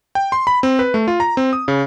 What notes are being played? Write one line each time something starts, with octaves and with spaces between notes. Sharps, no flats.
G5
C6
B5
C4
B4
A3
F4
A#5
C4
D#6
C#3